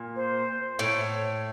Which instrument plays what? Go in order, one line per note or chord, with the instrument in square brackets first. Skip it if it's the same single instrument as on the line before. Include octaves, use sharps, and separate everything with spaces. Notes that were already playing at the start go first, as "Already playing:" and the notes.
Already playing: [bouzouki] A#2
[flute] C5
[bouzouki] A2 [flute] C#5